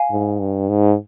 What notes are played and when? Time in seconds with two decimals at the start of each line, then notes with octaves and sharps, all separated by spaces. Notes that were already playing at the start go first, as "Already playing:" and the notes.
Already playing: F5 G#5
0.11 G#2
0.40 G2
0.69 G#2